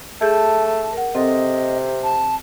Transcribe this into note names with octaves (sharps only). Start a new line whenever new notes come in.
A3 G#4 A5 G6
A#4 F#5
C3 C4 A4 D#5
A5